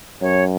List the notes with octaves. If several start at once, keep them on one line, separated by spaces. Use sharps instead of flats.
F#2 C#5